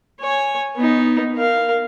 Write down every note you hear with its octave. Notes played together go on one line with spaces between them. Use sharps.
C#5 G#5
B3 D#4
A#4 F5